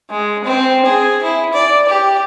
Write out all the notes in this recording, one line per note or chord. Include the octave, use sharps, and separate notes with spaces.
G#3
C4
G#4
E4
D5
G4